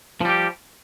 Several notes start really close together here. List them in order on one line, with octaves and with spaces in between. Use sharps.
F3 G3 G4